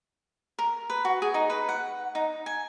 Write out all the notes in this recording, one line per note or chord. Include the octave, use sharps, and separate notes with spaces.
A#4
B4
F#4
G#4
D#4
B4
F#5
D#4
G#5